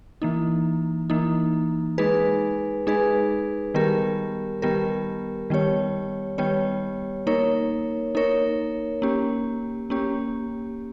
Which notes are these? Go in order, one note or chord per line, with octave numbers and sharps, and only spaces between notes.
E3 A#3 D#4
E3 A#3 D#4
G#3 D#4 G#4 B4
G#3 D#4 G#4 B4
D#3 G3 B3 G4 A#4
D#3 G3 B3 G4 A#4
D#3 G3 B3 G4 C#5
D#3 G3 B3 G4 C#5
A#3 D#4 A#4 C#5
A#3 D#4 A#4 C#5
A#3 C#4 G4
A#3 C#4 G4